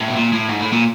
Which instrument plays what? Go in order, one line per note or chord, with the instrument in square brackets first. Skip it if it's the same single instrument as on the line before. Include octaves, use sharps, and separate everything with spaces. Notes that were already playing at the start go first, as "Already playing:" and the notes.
[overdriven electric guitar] A2
B2
A#2
A2
G#2
A2
A#2